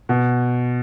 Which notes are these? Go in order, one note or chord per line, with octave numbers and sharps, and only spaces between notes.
B2